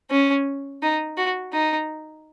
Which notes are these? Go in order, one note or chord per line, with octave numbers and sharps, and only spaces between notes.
C#4
D#4
F#4
D#4